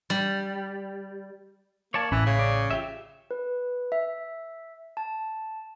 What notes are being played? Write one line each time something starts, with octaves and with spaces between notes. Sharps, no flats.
G3
A#3 C#5 D5 A5
A1 E3 C#4 B5
C#3
D5
F4 G4 E5
B4
E5
A5